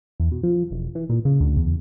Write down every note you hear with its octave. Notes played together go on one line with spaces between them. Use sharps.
E2
B2
F3
E1
E3
A#2
C#3
D2
E2